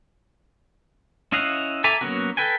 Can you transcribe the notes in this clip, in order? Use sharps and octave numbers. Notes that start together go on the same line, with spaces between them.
C#4 E4 D#5 F5 F#5
A4 E5 G#5 A#5 D6
F#3 A#3 B3 C#4 F#4
A4 B4 G5 G#5